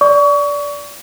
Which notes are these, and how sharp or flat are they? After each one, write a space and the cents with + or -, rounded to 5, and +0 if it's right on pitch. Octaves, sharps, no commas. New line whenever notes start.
D5 -20 C#6 +30